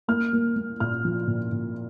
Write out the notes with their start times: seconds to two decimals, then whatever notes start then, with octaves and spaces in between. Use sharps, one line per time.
0.08 A#3 F6
0.33 A#3
0.56 A#3
0.80 A#2 F6
1.05 F3
1.27 A#2
1.52 A#2